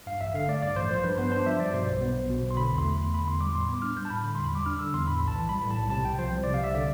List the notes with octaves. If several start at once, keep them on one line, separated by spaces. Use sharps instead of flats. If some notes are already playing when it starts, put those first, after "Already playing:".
G2 F5
A1 E5
D3 F5
A3 D5
G2 D5
A1 C5
F3 C5
G2 B4
B3 C5
D4 C5
F3 E5
G2 D5
B2 C5
B1
B3
B1
B2
B1
C6
D3 B5
E2
C6
A3
E2
D3 B5
E2 C6
G3 D6
A2 C6
B3 D6
D4 F6
G3 G6
A5
A2 B5
D3 B5
E2 C6
B5
G3 D6
D4 F6
D3 E6
E2 C6
A2 B5
B1
A5
E3
G3 B5
A2
A5
B1
C3 A5
C2 G5
F3 C5
C2
C3 D5
F5
C2 E5
D3 D5